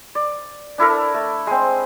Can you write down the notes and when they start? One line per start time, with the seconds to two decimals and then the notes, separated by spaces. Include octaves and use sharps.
0.15 D5
0.78 D4 E4 A4 A#4
1.14 A3
1.47 G#3 C4